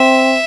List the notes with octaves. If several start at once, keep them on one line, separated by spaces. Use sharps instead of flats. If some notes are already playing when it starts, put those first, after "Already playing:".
Already playing: C4 E5